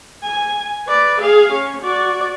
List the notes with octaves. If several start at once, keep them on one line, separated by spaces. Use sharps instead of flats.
G#5
B4 D5
G#4 F5
C#4
F#4 D5